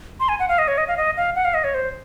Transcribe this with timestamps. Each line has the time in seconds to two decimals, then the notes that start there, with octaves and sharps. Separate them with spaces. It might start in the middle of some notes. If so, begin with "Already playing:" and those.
0.20 C6
0.29 G#5
0.39 F#5
0.48 F5
0.58 D#5
0.68 C#5
0.78 D#5
0.88 F5
0.97 D#5
1.17 F5
1.36 F#5
1.45 F5
1.54 D#5
1.64 C#5
1.74 C5